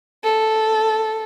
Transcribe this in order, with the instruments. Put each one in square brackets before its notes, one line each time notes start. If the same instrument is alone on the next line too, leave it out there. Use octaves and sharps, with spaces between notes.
[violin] A4